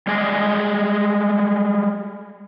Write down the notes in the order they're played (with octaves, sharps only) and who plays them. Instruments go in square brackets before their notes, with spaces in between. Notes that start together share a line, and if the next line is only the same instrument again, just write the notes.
[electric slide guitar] G3 G#3 G#4 D5 D#5